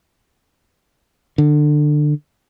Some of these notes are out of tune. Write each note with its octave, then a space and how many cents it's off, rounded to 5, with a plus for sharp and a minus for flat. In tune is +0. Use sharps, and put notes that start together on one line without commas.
D3 +20